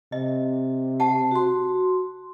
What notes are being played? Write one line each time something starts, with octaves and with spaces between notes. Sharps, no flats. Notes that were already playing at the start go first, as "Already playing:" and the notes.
C3 D#5
G4 F#5 A5
F#4 C6